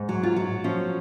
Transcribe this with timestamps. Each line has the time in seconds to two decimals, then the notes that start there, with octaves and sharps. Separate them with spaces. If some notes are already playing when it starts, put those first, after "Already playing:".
Already playing: G#2
0.09 F#3
0.23 F4
0.36 F#3
0.64 F3 C#4